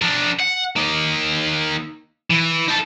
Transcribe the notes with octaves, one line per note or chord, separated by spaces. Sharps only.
D4 A#4
F#5
A#3 D#4
E3
D#4 A4